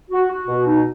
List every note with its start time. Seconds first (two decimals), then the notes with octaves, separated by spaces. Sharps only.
0.11 F#4
0.30 F#4
0.48 B2
0.66 D#4